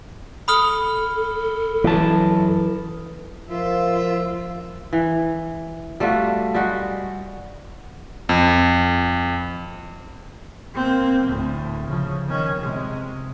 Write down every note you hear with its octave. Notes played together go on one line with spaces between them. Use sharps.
A4 B5 D#6 F6
F#2 E3 A5
F3 F4 A#4 E5
E3
G3 A3 F4 F#4
G3 G#3 F#4
F2
A#3 C4
D2 A2
C#3 F3
D#3 C#4
C3 G#3